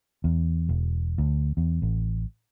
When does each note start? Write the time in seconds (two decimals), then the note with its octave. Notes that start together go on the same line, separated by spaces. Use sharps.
0.24 E2
0.69 E1
1.18 D2
1.57 E2
1.82 A1